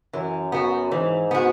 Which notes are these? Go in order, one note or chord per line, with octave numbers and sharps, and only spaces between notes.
F#2 E3
B3 F#4
G#2 E3
B3 F#4